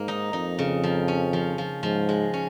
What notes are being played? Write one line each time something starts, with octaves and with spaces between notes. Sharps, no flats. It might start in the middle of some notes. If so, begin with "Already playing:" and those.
Already playing: G#2 A#3
D#4
F2 D#4
C#3
F3
C#4
F3
F3
G#2 F3
G#3
C#4